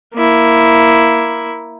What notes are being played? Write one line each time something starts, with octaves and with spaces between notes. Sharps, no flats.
A#3 E4